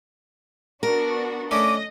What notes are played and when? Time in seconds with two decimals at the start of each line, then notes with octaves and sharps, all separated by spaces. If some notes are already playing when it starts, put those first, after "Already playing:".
0.83 B3 D4 F#4 A#4
1.51 A3 C#4 D4 D#5 D6